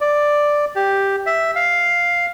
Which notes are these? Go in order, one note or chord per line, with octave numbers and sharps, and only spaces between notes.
D5
G4
E5
F5